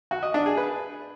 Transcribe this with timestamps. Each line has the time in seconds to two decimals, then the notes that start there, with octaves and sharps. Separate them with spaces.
0.11 F#4
0.23 D#5
0.34 D4
0.46 G#4
0.57 B4